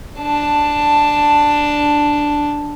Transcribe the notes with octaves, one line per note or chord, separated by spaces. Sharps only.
D4 A5